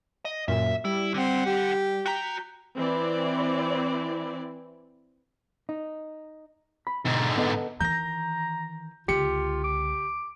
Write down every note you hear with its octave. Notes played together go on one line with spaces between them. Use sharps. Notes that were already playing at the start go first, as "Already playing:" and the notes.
D#5
F#2 A#2 E5
G3 E4
D3 C4 F#5
G4
F#4 G5 A#5 G6 B6
E3 C4 E4 D5
D#4
B5
G#2 B2 D3
B3 A4 D#5
D#3 E3 A#5 G6 A#6
C#2 D3 F4 G4 C#7
D6